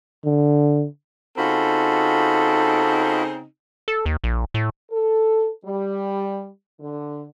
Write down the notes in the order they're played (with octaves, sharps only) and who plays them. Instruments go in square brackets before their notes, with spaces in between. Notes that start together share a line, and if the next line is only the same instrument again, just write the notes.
[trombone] D3
[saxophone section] C#3 C4 D#4 [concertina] F4 F#4 B5 [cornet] A4
[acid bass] A4
D#2
A#1
A2
[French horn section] A4
G3
D3